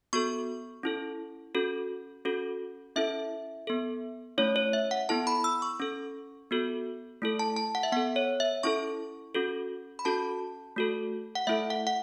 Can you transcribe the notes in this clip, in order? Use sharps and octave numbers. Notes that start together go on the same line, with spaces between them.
B3 F#4 A4 C#6
C#4 E4 A4
C#4 F#4 A4
C#4 F#4 A4
C#4 E4 A4 E5
B3 A4
A3 C#4 E4 C#5
C#5
E5
F#5
B3 E4 A4 A5
B5
E6
C#6
C#4 A4
B3 F#4 A4
A3 E4 A4
A5
A5
F#5
E5
B3 A4 F#5
C#5
E5
C#4 E4 A4 C#6
C#4 F#4 A4
B5
C#4 F#4 A4 A5
A3 F#4 A4
F#5
A3 E4 A4 E5
F#5
F#5